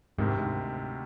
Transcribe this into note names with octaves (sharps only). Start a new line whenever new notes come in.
D2 G#2 C3 D#3
G#2